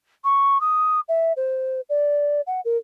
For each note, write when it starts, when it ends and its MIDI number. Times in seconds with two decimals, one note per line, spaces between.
0.24 0.60 85
0.61 1.00 87
1.08 1.33 76
1.37 1.81 72
1.90 2.41 74
2.47 2.61 78
2.65 2.77 70